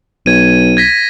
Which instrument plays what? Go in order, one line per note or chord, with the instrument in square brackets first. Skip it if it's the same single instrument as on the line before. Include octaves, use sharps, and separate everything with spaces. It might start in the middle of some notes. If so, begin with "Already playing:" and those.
[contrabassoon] B1 [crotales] G#6 D#7
[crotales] G#6 A#6 B6